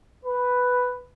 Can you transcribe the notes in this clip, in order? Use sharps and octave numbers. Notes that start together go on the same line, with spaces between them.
B4